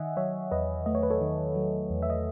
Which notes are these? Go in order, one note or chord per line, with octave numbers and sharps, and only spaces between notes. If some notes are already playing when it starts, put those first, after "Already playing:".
Already playing: D#3 D#5 E5 F#5 G#5
F#3 C#5 E5
E2 B4 D#5
A3 D#5
C#5
B4
A4 C#5
D#3
F#3
E2
E5
D#5